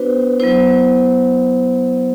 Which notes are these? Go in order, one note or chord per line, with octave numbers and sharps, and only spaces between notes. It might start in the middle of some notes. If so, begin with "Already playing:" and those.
Already playing: B3 D4 F#4 B4 C5
F#3 B3 E4 C5